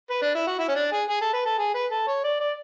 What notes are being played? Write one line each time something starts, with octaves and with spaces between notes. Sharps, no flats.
B4
D4
E4
F#4
E4
C#4
D4
G#4
G#4
A4
B4
A4
G#4
B4
A4
C#5
D5
D5